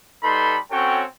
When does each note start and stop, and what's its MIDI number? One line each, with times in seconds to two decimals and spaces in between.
0.23 0.58 55
0.23 0.58 63
0.23 0.58 69
0.23 0.58 71
0.23 0.58 83
0.23 0.58 84
0.71 1.04 60
0.71 1.04 61
0.71 1.04 66
0.71 1.04 69
0.71 1.04 73
0.71 1.04 79